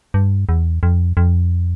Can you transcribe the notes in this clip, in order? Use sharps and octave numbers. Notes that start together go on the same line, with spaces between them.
G2
E2
F2
F2